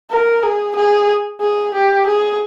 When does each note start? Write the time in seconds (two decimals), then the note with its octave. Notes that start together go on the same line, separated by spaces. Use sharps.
0.10 A#4
0.43 G#4
0.76 G#4
1.41 G#4
1.74 G4
2.07 G#4